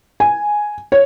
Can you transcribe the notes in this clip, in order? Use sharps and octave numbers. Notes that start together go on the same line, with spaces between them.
G#5
C#5